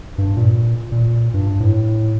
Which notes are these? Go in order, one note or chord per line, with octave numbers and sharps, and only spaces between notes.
G2
A#2
A#2
G2
A2